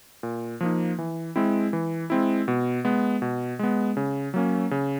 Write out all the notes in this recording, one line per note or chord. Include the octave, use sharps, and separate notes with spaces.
A#2
F3 A#3 D#4
E3
G#3 C4 E4
E3
G#3 C4 E4
B2
G#3 B3
B2
G#3 B3
C#3
F#3 A#3 C#4
C#3